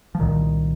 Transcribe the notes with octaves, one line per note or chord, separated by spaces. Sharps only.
F3
C2 A#2 D#3